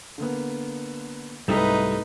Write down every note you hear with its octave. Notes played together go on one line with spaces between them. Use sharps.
D3 A#3 B3
C2 G#2 G3 A3 D#4 B4 B6